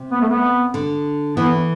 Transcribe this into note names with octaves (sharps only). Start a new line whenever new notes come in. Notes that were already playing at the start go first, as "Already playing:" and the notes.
Already playing: C3
B3
A3
B3
D3
E3 B3